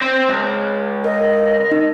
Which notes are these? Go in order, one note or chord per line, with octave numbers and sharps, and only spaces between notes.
C4 C5
C#2
A#4 D#5
D#4